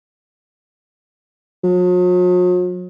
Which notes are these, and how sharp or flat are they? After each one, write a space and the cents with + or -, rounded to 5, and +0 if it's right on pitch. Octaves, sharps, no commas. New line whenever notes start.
F#3 -45